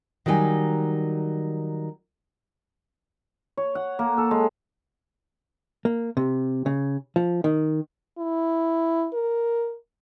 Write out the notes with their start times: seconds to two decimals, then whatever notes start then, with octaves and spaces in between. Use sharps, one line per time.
0.26 D#3 F#3 G3 D#4 G#5
3.57 C#5
3.75 F#5
3.99 A#3
4.18 A4
4.31 G#3
5.85 A#3
6.17 C3
6.66 C#3
7.16 F3
7.44 D#3
8.19 E4
9.14 A#4